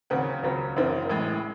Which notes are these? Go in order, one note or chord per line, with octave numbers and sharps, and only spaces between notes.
D#2 C#3 F#3 C4 F#5
C#2 C#3 F#3 C4
F#1 F#2 E3 C4
A1 A2 G#3